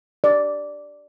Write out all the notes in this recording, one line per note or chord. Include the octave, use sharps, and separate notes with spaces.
D5